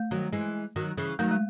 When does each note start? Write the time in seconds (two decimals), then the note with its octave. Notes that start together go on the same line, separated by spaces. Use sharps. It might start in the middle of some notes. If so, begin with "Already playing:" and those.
Already playing: A3
0.11 D#3 F#3
0.33 E3 G#3
0.76 D#3 F#3
0.97 C#3 E3
1.19 D#3 F#3 A3
1.31 G#3